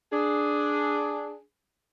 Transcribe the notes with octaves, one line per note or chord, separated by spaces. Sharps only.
D4 G#4